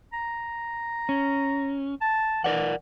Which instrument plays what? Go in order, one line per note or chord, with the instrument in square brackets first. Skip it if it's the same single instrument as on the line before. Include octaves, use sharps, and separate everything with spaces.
[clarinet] A#5
[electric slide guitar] C#4
[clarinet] A5
[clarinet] E3 [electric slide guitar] A#4 D5 F#5